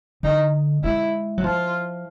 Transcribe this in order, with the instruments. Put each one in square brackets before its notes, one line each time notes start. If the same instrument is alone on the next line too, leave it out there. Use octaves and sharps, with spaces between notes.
[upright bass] D3 [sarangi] D#4
[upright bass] G#3 [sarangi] E4
[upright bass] F#3
[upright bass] F3 [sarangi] F4